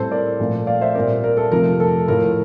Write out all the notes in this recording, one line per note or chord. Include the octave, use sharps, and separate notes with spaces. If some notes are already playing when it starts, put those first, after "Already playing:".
Already playing: A2 G3 C4 A4 C5
A#4 D5
A#2 F3 A3 C4
D5 F5
C5 E5
A#2 G3 C4 A#4 D5
A#4
A4
F2 C3 F3 A3 A#4
A4
A2 F3 A3 A#4